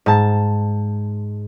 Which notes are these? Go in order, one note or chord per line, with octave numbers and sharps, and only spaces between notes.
G#2 A5